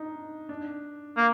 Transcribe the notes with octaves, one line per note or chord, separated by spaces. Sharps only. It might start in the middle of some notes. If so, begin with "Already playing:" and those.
Already playing: D4 D#4
D4
A#3